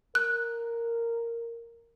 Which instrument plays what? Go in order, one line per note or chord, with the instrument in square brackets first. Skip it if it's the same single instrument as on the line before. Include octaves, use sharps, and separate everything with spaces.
[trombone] A#4 [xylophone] F#6